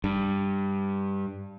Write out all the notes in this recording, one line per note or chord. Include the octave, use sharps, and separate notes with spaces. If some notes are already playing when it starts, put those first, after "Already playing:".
G2